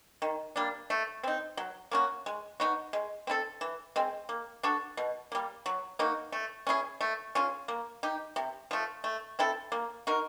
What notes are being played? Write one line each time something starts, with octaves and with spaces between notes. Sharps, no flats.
D#3
G3 A#3 D4
A3
C4 D#4
F#3
A#3 C#4 F#4
G#3
B3 D#4 F#4
G#3
C4 E4 A4
E3
G#3 C4
A#3
D4 F#4 A4
B2
G3 A#3
F#3
A#3 D#4 F#4
A3
C#4 E4 G#4
A3
C#4 F4 G#4
A#3
D#4 G4
C3
F3 A3
A3
C4 E4 A4
A#3
D#4 F#4 A#4